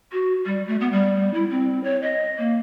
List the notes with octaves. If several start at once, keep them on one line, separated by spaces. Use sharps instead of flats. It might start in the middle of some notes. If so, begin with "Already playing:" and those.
F#4
G3
A3
B3
G3
E4
C4
C#5
D#5
A#3